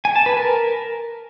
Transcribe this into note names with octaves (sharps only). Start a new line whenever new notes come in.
G#5
A5
B4
A#4